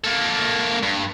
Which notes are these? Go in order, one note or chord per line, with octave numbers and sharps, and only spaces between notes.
A#3 A4
G2